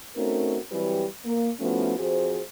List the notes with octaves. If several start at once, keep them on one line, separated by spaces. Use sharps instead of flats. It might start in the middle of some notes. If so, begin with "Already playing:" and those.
A3 C4 C#4 D#4 F#4 A#4
E3 F#3 G3 C4 G4 B4
A#3
F3 A3 B3 C#4 E4 F#4
F2 F#4 G#4 C5